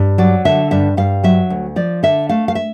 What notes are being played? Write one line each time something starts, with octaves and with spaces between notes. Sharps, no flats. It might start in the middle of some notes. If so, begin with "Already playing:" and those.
Already playing: G2
F#3 D5
D3 E5
G2 E5
G2 F5
F#3 E5
D2
F3 D5
D3 E5
A3 F5
F5
E5